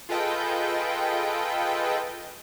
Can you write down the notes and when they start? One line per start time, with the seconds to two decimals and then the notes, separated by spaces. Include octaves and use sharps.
0.09 F4 G#4 A4 B4 D#5 G5